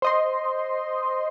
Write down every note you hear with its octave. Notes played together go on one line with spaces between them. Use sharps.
C5 D#5 C6